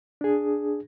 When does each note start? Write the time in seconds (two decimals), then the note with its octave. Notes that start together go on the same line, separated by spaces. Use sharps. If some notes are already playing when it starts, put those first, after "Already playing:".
0.21 D4 G#4